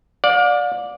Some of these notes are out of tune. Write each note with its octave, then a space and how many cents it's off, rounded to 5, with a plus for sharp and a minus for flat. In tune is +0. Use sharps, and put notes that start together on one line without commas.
D5 +0 F5 +40